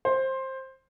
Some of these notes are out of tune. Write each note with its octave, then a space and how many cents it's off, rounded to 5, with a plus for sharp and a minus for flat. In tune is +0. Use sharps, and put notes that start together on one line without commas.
C5 +15